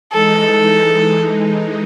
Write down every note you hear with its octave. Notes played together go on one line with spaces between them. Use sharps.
E3 G#3 D#4 A4